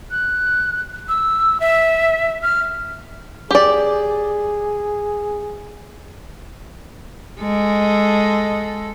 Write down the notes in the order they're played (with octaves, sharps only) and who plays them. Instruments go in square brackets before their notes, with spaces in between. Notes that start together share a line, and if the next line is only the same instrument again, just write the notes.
[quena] F#6
E6
E5
F6
[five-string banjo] G4 D5 [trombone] G#4
[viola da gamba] G#3 A4